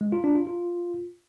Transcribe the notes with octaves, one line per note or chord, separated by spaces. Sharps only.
G#3
F4
D4
F4
F4